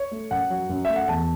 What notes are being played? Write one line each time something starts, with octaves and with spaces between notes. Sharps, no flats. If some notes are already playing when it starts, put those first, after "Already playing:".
Already playing: C#5
A3
F#2 F#5
F#3
F#2
A3 E5
F#5
E2 A5